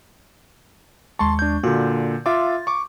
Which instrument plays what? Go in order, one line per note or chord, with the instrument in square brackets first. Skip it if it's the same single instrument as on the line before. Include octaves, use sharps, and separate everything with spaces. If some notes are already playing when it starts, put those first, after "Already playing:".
[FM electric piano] D#2 G#3 C#6 [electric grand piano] A5 C6
[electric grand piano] D4 G6
[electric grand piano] A#2 D3 [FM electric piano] F#4
[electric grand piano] F4 E5 D6 [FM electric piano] F5 C6 A6
[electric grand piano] C#6 D6